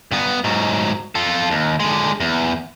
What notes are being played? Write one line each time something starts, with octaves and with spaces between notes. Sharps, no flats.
G2 B3
G#2 F#3
F4 A4
D#2
D3 G#3
E2